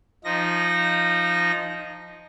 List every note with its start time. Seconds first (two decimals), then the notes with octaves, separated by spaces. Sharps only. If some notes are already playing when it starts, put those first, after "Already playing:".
0.24 F3 D#4 A#6